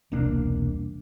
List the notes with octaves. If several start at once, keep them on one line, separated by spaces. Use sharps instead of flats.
E1 C2 A#3 D4